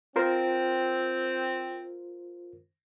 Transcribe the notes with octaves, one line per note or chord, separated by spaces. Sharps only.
C4 F4 A#4 C5